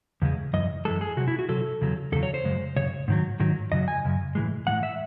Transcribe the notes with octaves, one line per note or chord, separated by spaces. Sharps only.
E2 C#3 G#3
F#2 E3 D#5
F#2 E3 G#3 A4
G#4
C3 F#3 F#4
E4
F#4
C3 F#3 A4
E2 C#3 F#3
E2 C#3 F#3 A4
C#5
C5
F#2 C#3 G#3
F#2 C#3 C#5
G#2 D#3 F#3
G#2 D#3 F#3
F#2 C#3 F#3 D#5
G#5
F#2 C#3
A2 E3 G#3
A2 E3 G#3 F#5
E5